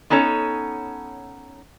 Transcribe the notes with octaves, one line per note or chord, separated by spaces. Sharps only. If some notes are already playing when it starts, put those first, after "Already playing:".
B3 C#4 D#4 A4 C#5